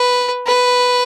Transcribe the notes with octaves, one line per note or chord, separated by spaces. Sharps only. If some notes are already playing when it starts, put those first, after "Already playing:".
Already playing: B4
B4